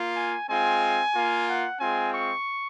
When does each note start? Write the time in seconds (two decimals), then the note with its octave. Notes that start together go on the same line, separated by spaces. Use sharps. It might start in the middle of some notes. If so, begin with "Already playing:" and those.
Already playing: A#3 F4
0.16 G#5
0.49 G#3 C4 F4 G#5
1.14 A#3 F4
1.47 F#5
1.80 G#3 C4 F4 G#5
2.13 C#6